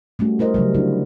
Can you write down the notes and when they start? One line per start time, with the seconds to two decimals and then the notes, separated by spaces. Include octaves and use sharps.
0.19 G3 A3 C#4 F#4
0.39 E4 A#4 C5 D#5
0.54 C#3 F#3 G3
0.74 D3 D4 E4 F#4